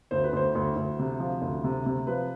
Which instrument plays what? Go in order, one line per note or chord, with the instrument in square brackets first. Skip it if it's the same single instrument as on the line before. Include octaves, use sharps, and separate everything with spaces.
[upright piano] D2 C5
B4
D2 C5
D2
D2
C3
F3
D2
C3
C3
F3 B4